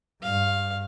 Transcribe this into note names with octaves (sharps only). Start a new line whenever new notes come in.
G2 F5